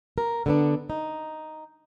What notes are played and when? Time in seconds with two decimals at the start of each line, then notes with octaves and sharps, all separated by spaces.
0.18 A#4
0.46 D3 B3 D4
0.90 D#4